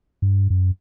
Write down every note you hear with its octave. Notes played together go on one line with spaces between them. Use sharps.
G2
F#2